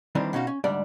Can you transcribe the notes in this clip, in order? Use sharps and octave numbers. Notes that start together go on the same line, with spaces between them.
D#3 E3 G3 C4 D4
B2 C#4 D#4 F#4 F5
C#4
D2 G#2 G3 D4 D5